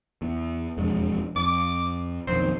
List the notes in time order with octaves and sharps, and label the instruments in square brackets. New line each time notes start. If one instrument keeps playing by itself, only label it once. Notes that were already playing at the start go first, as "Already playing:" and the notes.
[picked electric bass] E2
E1 F2 G#3
[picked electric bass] F2 [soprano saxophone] D6
[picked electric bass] B1 F2 D#3 [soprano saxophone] C5